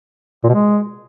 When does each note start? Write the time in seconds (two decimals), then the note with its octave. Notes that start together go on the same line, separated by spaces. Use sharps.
0.44 A#2
0.49 B2
0.54 G#3